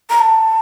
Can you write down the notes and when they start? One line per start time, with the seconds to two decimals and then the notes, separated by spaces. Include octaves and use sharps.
0.10 A#5
0.20 A5